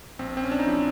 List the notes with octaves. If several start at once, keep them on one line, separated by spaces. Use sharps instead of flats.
A#1 C4
C4
C#4
D4
D#4
F3 E4